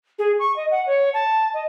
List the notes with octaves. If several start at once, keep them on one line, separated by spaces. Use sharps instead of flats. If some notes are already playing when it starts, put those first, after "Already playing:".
G#4
C#6
D#5
F#5
C#5
A5
D#5